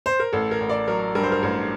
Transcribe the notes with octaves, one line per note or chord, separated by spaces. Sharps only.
C5
A#4
A1 A4
A#4
A1
D5
F#3 A#4
G2 A#4
C5
A#4
A1 A#4